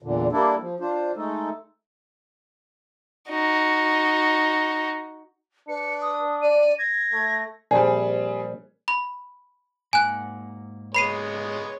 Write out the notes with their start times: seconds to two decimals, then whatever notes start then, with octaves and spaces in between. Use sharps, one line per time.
0.02 E2 A#2 D3
0.32 G3 A#3 D4 E4 A4
0.61 F3
0.80 D4 F4 C5
1.16 G#3 A3 D#4 A4
3.29 D#4 F#4
5.68 D4 B4 C#7
6.02 D#6
6.42 D5 D#7
6.78 G#6 A#6
7.13 A3
7.71 A#1 G3 C4 G#4
8.88 B5
9.93 G#2 A#3 F#5 G#5 F#6
10.94 G#3 B3 C#5 B5 C7 D#7